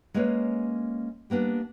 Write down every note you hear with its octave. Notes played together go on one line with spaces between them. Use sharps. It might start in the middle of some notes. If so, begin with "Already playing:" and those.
G#3 A#3 C#4 B4 C#5
G3 A#3 B3 D4